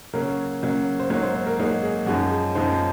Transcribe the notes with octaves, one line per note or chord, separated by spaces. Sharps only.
C#3 F#3 A#3 C#4 A#4
C#3 F#3 A#3 C#4
C5
G#2 F#3 A#3 D#4 C#5
C5
C5
A#4
G#2 F#3 A#3 D#4 G#4
G#4
F#2 F3 G#3 D#4 F#4
G#4
F#2 F3 G#3 D#4 C5